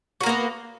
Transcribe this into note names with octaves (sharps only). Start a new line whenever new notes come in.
A#3 B3 F#4 A#4